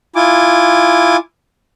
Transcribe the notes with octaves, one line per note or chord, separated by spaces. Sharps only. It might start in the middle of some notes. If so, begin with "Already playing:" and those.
E4 F4 G#5 D6